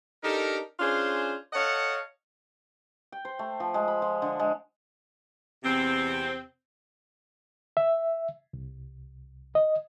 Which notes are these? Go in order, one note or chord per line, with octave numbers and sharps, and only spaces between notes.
D4 D#4 G4 A4 A#4
C#4 D4 F4 G#4 C5
A4 C#5 D#5 F5 F#5 A5
G5
C5
A3
F3
G#3
B5
F3
D3
G#3
E2 C3 C4
E5
C2
D#5